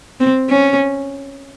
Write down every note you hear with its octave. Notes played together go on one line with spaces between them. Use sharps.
C4
C#4